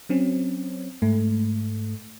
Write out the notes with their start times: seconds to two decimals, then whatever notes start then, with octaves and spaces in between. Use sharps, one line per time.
0.09 F#3 C4 C#4
1.02 G#2 A3